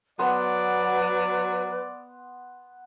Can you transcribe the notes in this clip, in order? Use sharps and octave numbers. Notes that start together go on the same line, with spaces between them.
F#3 B3 B4 D5 C6